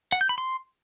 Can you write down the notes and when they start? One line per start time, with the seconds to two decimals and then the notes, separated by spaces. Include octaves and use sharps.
0.12 F#5
0.21 G6
0.29 B5
0.38 C6